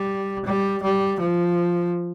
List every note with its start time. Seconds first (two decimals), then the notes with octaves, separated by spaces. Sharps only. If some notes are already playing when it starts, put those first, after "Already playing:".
Already playing: G3
0.45 G3
0.83 G3
1.21 F3